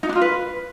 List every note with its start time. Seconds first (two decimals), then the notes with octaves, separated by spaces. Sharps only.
0.03 D#4
0.09 D4
0.15 F4
0.21 B4